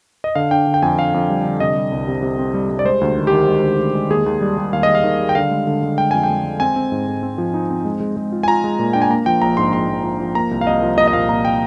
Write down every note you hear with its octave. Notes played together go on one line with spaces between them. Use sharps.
D#5
D3 F5
D4 G5
D3
G5
F2 G#5
D3 F5
F2
G3
D3
C3 D#5
G3
C2
C3
C3
C4
G3
G3
D5
G#3 C5
D2
D#3
G4
D#3
G#3
D2
D2
G#3
D#2 G#4
D#2
G3
G3
D#2 F5
D#5
D#2
F5
D#3
G3
G5
D3 F5
G#3
D3
G#3
G#3 G5
F2 G#5
G5
G#3
G#3
C4 G#5
C4
G#2
G#2
C4
F3
D#4
C4
G#3
G#3
G#3
F4
G#5
F4 A#5
G#3
A#2
D4 G5
G#5
A#3 A#5
F3 G5
A#1 A#5
G#2 C6
G#2 C6
A#1
F3
F3
A#3 A#5
C2
F5
C2 D#5
F3
A#3 D#5
D#5
A#2 F5
A#2 A#5
G5